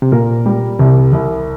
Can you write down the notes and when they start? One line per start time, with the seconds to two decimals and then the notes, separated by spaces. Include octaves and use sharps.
0.02 C3
0.12 A#2 A#4
0.46 G3
0.79 C2 C3
1.13 C2